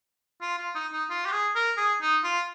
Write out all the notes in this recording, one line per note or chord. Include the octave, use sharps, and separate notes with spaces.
F4
F4
D#4
D#4
F4
G4
G#4
A#4
G#4
D#4
F4